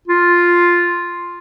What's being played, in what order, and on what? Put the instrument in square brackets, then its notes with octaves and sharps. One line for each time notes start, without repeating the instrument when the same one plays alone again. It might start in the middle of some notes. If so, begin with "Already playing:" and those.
[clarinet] F4